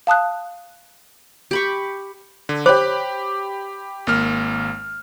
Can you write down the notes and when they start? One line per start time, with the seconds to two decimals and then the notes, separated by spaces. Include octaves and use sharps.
0.07 F5 A5 D#6 F#6
1.51 G4 B5 C#6
2.49 D3
2.66 G4 C5 C#5 B5 D6
4.07 G#1 A#3 F6